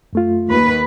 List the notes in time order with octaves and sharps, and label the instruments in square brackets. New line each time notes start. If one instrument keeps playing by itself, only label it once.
[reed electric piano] F#2 A3 F4
[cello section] D#2 B4